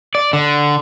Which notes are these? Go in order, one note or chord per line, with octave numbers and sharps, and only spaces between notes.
D5
D3